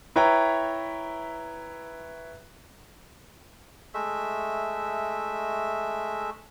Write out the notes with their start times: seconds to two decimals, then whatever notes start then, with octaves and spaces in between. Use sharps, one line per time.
0.16 E4 B4 C#5 E5 G5 A#5
3.94 G#3 A3 E5